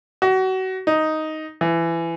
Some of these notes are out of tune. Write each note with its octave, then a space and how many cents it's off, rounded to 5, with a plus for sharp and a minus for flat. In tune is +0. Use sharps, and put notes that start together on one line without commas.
F#4 +30
D#4 +5
E3 +20